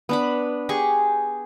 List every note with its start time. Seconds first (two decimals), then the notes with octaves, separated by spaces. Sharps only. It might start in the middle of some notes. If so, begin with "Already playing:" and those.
0.09 B3 D4 B5
0.69 G4 G#4 C#6